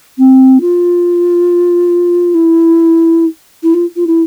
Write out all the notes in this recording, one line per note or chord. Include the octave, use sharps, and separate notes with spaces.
C4
F4
E4
E4
F4
F4
E4